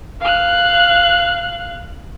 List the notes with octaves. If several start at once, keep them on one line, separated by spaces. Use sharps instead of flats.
F5 F#6